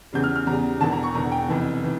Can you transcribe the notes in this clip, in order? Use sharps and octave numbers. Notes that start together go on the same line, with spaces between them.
E2 C#3 G3 G6
F6
F6
E2 C#3 G3 A#5
E1 E2 D3 A5
A#5
C#6
E1 E2 D3 A#5
G5
F1 F2 E3
E3